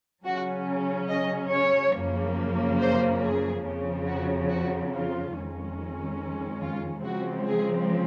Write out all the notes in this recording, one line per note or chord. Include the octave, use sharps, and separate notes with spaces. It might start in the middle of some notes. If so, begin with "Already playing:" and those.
C#3 F#3 C#4 F#4
D#5
C#5
F#2 C#3 F3 A#3
C5
G#4
F2 C#3 F3
F#4
F#4
F4
F2 D#3 G#3 C#4
F4
C#3 F3 G#3 C4 F#4
G#4